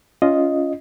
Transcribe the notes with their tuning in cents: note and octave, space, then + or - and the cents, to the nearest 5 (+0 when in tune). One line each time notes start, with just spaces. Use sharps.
C#4 +20 F4 -5 D#5 +0